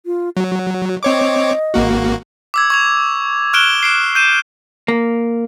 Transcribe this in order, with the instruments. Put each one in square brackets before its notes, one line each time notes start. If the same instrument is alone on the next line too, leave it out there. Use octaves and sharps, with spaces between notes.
[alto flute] F4
[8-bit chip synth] F#3 [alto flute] F#4
[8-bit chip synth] C4 C#5 D6 [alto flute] D#5
[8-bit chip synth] G#1 A#3 F#4
[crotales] D6 E6 G#6
C#6 G#6 F7
C#6 F6 F#6 D7 E7 G7
C7 D7 E7
G6 D#7 E7
[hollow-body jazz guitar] A#3